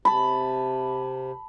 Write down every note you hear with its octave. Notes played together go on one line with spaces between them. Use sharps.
C3 A5 B5